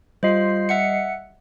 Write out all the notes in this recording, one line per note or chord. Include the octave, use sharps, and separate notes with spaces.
G3 F4 C5 D#5 C7
E5 F#5 C#7